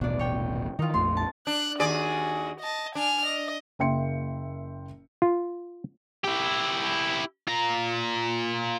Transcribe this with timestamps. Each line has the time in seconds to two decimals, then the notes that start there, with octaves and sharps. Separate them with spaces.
0.01 D#1 A1 B2 D4 D5
0.19 C#5 G5
0.79 D#3 E3 D#4 F4
0.94 A#1 F2 A3 C6
1.17 A5
1.47 D4 F#6
1.79 D#2 F#4 G#4 D5
2.60 D#5 A5
2.95 D4 G#5 F6
3.25 D#5
3.79 F#1 A#3 E5 G5 C6 C#7
5.22 F4
6.24 E4 G4
7.48 F4 A#5